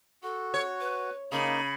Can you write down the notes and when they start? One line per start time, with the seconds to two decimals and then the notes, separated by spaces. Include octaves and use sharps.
0.23 F#4 A4
0.54 C#5
0.80 B4
1.32 C#3 A#3 D#4 B5